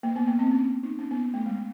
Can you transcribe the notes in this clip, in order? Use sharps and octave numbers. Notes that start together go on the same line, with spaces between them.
A#3
B3
A#3
C4
C#4
D#4
C#4
B3
A3
G#3